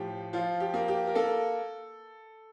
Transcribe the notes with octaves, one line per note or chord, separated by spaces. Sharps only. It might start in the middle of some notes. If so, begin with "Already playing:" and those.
Already playing: A2 F3 G4
F3 F4
G4
A#3
G4
A#4
A#3 A4